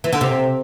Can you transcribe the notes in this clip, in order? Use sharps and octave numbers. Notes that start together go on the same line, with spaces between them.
E3
D3
C3